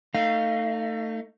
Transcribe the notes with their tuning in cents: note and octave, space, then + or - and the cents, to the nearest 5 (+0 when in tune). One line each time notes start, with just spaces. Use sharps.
A3 +25 D#4 +0 F5 -10